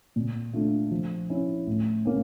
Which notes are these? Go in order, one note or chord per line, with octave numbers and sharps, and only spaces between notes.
A#2
A3 D4 F4
F3
C#4 E4
A2
A#3 C#4